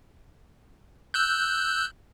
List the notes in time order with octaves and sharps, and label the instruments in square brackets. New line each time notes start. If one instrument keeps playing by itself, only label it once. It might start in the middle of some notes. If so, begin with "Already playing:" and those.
[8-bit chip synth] E6 F#6 G6